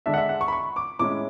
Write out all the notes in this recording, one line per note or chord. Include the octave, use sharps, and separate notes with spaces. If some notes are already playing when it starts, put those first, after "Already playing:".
D3 G#3 D4 E5
F#5
E5
F#5
C#6
B5
C#6
D6
A2 G#3 C#4 E4 D6